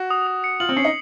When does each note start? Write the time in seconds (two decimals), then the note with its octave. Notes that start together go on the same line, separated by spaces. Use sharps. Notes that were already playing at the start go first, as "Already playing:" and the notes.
Already playing: F#4
0.11 D#6
0.27 D#6
0.44 C#7
0.60 F4 F#7
0.69 C4
0.77 C#4 C7
0.85 D#4